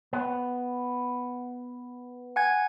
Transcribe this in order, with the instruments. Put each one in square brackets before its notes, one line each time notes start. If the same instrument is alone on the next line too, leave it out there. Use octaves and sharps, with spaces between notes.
[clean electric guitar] B3
[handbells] F#5 G#5 G#6